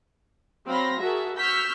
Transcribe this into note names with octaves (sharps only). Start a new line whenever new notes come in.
F#3 C4 F5 B5 C6 A#6
F#4 G#4 A#4 E5 A5
C#6 E6 F6 G6 B6